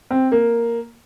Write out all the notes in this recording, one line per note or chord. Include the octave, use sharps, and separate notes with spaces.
C4
A#3